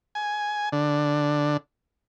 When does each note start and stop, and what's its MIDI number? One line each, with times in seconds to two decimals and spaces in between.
0.15 0.69 80
0.72 1.57 50